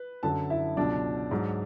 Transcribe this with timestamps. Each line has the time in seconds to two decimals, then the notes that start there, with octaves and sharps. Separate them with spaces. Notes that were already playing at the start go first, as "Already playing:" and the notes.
Already playing: B4
0.23 F#2 D3 F#3 A4 A5
0.50 E4 E5
0.77 C#2 B2 F#3 D4 D5
1.31 G#2 F#3